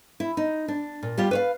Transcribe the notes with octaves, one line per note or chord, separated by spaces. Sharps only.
E4
D#4
D4
A#2
G3 F4 G4
B4 C#5 F5